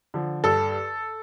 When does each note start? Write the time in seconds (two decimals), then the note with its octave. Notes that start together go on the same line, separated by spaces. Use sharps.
0.14 D3 F3
0.44 G2 A4